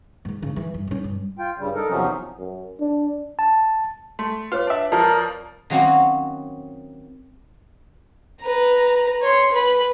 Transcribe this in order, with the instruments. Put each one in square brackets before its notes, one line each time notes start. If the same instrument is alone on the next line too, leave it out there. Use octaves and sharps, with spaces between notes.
[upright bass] G#2 D#3
C#3
E3
G2
B2 C#4
G2
[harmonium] F4 G5
G2 C#3 G3
D#4 A4 A#4
E2 C3 F3 F#3 C#4 D#4
[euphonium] F#2
D4
[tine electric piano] A5
[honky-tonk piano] A3 [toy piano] C6
[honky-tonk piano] F4 [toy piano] B4 C#5 D6
[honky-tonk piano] D4 E5
[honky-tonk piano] F2 F3 [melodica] A#4 [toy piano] D5 A5 C#6
[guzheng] D#3 F#3 A#3 C4 C#4 F#4
[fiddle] B4 A#5
C#5 C6
B4 B5